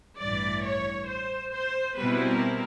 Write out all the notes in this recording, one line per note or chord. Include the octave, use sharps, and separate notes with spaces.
A1 G2 E3 D5
C#5
C5
C5
B2 G3 C4 E4 B4
A#4